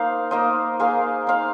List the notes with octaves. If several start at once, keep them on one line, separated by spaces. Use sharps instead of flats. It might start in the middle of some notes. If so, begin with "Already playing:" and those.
Already playing: A#3 D#4 C5 F5
A#3 D#4 C5 D#5
A#3 G#4 C5 F5
D#4 C5 F5